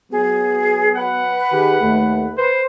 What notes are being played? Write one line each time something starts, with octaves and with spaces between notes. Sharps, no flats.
F#3 B3 G#4
B4 F#5
D#3 G4 G#4
D#2 A3
B4 C5